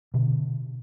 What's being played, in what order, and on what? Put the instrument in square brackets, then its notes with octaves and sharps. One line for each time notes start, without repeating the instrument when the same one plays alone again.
[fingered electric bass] B2 D3